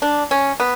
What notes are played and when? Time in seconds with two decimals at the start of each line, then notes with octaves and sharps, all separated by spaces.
0.02 D4
0.31 C#4
0.60 B3